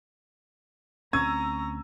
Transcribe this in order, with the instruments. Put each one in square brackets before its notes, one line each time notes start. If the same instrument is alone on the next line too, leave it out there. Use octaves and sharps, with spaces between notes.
[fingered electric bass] D2 C4 C#4 [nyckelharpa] A#5 [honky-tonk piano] C#6 E6 D#7 [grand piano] G#6